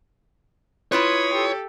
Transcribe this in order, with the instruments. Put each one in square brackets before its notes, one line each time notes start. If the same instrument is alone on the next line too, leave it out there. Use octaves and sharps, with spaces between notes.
[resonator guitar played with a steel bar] E4 F4 B4 [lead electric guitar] C#5 [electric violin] B5 G#6 [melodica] C6 D#6
[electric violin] G4 A4